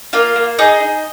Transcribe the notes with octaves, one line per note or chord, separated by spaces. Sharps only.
A#3 F4 F5
A#3
D#4 G#4 D#5
D#4